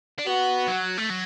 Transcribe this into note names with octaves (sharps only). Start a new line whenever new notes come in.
D4
B3 F#4
F#3
A3
F#3